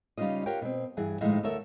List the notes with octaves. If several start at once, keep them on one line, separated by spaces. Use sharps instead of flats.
C#3 G3 C#4 D#4 F4 D#5
F4 G4 A#4 C#5 F#5 G5
B2 C4
G2 E3 G#4 F#5
A2 D#3 F3 G#3 D#4 E5
D2 A4 A#4 C#5 E5